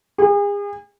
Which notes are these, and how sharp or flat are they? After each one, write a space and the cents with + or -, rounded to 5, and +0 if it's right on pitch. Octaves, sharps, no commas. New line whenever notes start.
G#4 -40